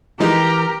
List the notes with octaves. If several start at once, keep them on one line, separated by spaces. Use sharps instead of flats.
E3 F3 G#3 D#4 G4 A#4